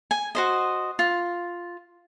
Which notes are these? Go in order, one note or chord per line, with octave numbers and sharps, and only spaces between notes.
G#5
F#4 C5 D#5
F4